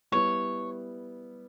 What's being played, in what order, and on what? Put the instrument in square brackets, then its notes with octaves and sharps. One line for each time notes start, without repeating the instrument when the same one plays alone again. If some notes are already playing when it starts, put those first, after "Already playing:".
[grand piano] G3 B3 E4 [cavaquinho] C#5